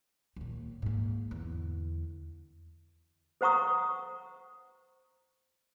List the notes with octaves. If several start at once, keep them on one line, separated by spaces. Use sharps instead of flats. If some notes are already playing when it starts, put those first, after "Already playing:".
D#2 A#2
G#2 A#3
E2 D3
A4 C5 F#5 A#5 C#6 D#6